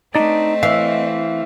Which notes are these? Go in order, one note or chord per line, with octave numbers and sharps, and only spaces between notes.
A3 C4 D4 D#4 D5 D#5
E3 F5